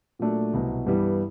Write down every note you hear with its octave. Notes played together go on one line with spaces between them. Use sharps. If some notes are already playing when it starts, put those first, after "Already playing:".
A#2 F#3 A3 D4
C2 B2 F#3
G2 E3 G3 B3